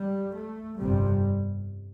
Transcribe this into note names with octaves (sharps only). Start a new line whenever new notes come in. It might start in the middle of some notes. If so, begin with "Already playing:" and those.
Already playing: G3
A3
G1 F2 C3 G3